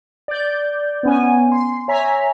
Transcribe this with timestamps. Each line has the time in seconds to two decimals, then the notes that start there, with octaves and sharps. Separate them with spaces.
0.28 D5 G6
1.03 B3 C#4 G#5
1.52 C6
1.88 C#5 E5 G#5 A#5 B6